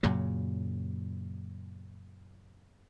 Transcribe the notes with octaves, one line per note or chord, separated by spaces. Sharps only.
F#2 A#2 C#3 F#3